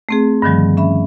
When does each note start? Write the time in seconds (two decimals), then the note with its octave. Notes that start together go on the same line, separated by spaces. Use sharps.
0.09 A3 C4 G#4
0.42 G2 D3 D#3 F3 G3
0.77 C#4 E5 B5